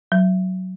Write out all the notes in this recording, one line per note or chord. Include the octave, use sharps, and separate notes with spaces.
F#3